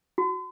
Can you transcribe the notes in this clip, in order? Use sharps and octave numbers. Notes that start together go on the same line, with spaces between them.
F#4